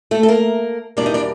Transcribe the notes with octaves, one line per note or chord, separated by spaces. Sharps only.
A3 A4
A4
A#3 A#4
E2 B2 G3 A#3 D4 D5
D#4 D#5
D4 D5